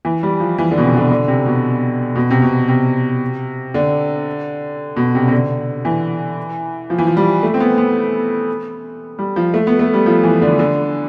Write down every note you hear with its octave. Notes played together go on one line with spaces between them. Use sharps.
E3
G3
F3
E3
D3
B2
C3
D3
D3
C3
B2
B2
C3
B2
C3
D3
B2
C3
C3
D3
E3
F3
E3
F3
G3
A3
C4
B3
B3
G3
F3
A3
B3
A3
G3
F3
E3
D3
D3